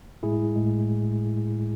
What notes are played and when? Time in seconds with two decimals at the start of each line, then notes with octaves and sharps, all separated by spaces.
0.23 A2 G#3 E4 G#4
0.55 A2 G#3